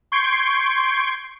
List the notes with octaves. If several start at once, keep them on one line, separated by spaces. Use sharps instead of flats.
C6 C#6 G6 G#6 C7 D7